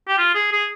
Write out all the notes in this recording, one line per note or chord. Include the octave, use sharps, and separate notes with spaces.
G4
F4
G#4
G#4